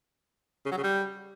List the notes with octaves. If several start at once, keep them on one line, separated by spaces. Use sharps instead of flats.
C#3
F#3
C#3
G3